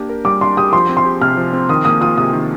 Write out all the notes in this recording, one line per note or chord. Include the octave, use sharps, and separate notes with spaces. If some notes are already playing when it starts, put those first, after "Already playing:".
Already playing: A#3 D4 G4
A#4
G3 D6
D4 C6
G4 D#6
F3 C6
C4
C6
G4
C3 F6
F3
C4
D#3 D#6
A#3 D#6
F4 D#6
C3 D#6
D#3